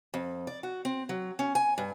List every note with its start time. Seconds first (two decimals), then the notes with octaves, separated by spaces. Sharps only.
0.14 F2
0.47 D5
0.63 F#4
0.85 C4
1.09 F#3
1.39 C#4
1.55 G#5
1.78 G2